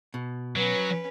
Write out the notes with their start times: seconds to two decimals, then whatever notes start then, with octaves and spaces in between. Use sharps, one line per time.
0.14 B2
0.56 F#3 C#4 B4